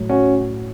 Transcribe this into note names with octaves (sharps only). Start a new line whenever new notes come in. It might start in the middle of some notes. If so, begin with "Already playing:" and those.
Already playing: A2 F#3
C#4 F#4